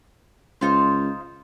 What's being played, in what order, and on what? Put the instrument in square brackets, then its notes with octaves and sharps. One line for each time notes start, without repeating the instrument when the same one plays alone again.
[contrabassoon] C#2 [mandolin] D#4 F4 C5